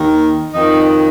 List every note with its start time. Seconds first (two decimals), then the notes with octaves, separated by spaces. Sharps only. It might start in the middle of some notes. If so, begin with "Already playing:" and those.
Already playing: D#2 D#3
0.53 F2 D#3 D#4